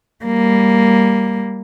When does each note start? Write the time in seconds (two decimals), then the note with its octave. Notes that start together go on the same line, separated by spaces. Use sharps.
0.25 G3 A#3